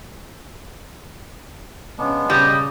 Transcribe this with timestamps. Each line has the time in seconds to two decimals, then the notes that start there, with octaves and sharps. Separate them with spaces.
1.98 C#3 G#3 B3 D4
2.30 C#3 G3 D#5